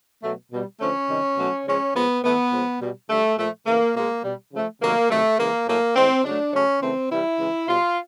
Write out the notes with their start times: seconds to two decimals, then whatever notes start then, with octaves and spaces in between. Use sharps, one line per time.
0.22 B2 F#3 A3
0.52 B2 G3
0.80 D3 F3 A3 C#4
1.09 C3 D#3 G3
1.37 B2 F#3 A3
1.66 C#3 F3 G#3 C#4
1.95 A#2 F3 G#3 B3
2.23 A2 E3 A3 B3
2.52 A#2 F3 G#3
2.81 B2 G3
3.09 D3 G3 A3
3.38 A#2 F3 A3
3.66 C#3 E3 A3 A#3
3.95 B2 G#3 A#3
4.23 B2 G3
4.53 C#3 F3 A3
4.82 C3 D#3 F#3 A3 A#3
5.10 C3 D#3 F#3 A3
5.39 C#3 E3 G#3 A#3
5.67 A2 F#3 A3 A#3
5.96 A2 E3 G#3 C4
6.24 C#3 F#3 A3 D4
6.53 C#3 F#3 A3 C#4
6.81 C#3 E3 A3 C4
7.10 C3 E3 G3 E4
7.39 C#3 E3 G#3
7.68 B2 G3 F4